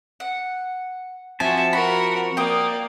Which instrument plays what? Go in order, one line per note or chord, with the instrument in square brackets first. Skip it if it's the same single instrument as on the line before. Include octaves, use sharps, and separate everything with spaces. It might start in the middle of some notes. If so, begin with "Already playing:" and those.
[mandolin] F#5
[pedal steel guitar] F3 C4 A5 [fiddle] F#4 E5 [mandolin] G#5
[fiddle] F#4 A#4 [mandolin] B5
[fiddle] A#3 D5 [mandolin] G5 D#6